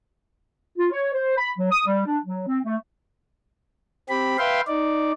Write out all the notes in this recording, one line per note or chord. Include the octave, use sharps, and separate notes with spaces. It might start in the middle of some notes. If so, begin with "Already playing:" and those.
F4
C#5
C5
B5
F#3
D#6
G3
D4
F#3
C4
A3
C4 G4 B5
B4 E5 F5 G5 C6
D#4 D5